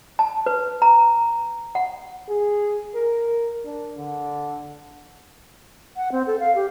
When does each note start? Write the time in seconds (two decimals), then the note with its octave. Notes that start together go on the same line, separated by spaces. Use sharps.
0.19 A5
0.46 B4
0.82 A#5
1.75 F#5
2.29 G#4
2.95 A#4
3.65 D4
3.98 D3
5.97 F#5
6.12 C4
6.27 A4
6.40 F5
6.55 G4